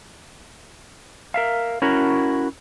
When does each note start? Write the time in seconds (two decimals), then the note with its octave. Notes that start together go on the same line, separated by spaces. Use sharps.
1.34 A#4 E5 F5
1.82 C#4 E4 F#4 A#4